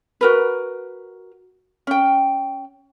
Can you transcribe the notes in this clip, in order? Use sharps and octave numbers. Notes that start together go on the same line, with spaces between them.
F#4 A#4 B4
C#4 G5